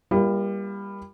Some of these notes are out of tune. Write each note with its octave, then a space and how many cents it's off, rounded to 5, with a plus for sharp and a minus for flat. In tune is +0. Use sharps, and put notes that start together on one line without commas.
G3 +20 A#3 +35 F4 -40